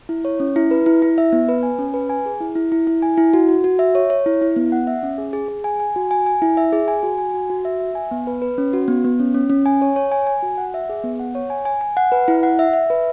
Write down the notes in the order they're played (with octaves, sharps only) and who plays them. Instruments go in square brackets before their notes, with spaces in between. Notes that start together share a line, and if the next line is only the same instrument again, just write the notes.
[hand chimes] E4
C#5
C#4
E4
B4
E4
E4
E5
B3
B4
G#5
C#4
B4
G#5
G#4
E4
E4
E4
E4
G#5
E4
F#4
F#4
F#4
E5
C#5
C#5
E4
E4
B3
F#5
E5
C#4
G#4
G#4
G#4
G#5
G#5
F#4
G#5
G#5
E4
E5
G#4
G#5
F#4
G#5
F#4
F#4
E5
E5
G#5
B3
B4
B4
C#4
F#4
B3
B3
C#4
C#4
C#4
G#5
C#5
C#5
G#5
G#5
F#4
F#5
E5
G#4
B3
F#5
C#5
G#5
G#5
G#5
F#5
B4
E4
F#5
E5
E5
B4